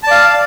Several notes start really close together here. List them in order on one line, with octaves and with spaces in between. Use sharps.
A5 D5 F5